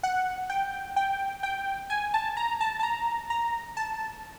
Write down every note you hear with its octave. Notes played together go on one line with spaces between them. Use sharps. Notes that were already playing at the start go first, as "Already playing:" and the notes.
F#5
G5
G5
G5
G#5
A5
A#5
A5
A5
A#5
A#5
A5